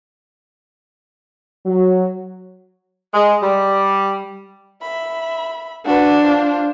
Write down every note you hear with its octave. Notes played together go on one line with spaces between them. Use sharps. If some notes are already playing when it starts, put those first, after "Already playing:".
F#3
G#3
G3
E5 B5
D4 F#4 B4
F4 C5